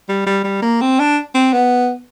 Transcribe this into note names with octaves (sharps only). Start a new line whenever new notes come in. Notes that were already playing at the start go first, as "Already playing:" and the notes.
G3
G3
G3
A#3
C4
D4
C4
B3